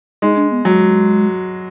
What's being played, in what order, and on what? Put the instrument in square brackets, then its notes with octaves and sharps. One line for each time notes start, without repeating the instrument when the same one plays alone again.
[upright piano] G#3 [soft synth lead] D#4
[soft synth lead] D4
B3
[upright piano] F#3 [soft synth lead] G#3